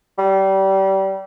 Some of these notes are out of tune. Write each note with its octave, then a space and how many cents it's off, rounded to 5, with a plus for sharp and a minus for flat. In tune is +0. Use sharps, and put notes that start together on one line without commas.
G3 -25